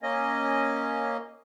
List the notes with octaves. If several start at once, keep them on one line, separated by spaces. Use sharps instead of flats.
A#3 C#4 D#5